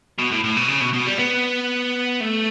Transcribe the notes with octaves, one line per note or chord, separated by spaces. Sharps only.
B2
A2
A2
B2
C#3
B2
B2
G3
B3
A3